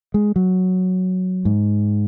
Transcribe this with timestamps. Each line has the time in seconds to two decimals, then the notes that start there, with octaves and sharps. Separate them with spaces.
0.14 G#3
0.36 F#3
1.45 G#2